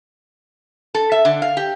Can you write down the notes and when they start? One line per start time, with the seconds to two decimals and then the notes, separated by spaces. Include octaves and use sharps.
0.95 A4
1.12 E5
1.25 D3
1.42 F5
1.57 G4